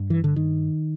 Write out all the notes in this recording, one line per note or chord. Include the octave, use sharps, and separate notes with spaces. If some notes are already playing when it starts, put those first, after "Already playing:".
Already playing: G2
E3
D3
D#3